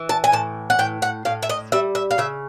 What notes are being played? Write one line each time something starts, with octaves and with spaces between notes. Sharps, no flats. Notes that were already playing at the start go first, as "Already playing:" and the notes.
Already playing: E3
A5
G#5
A2 A5
F#5
A2 G5
F#5
A2 F5
E5
D#5
G3 E5
E5
F5
C#3 E5